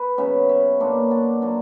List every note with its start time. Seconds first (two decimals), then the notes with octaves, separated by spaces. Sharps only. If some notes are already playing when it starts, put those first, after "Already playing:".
Already playing: B4
0.18 C#3 F#3 B3 C#5 E5
0.49 C#5 E5
0.80 A#2 A#3 D4
1.11 D5 F#5
1.42 D3 F#3 A#3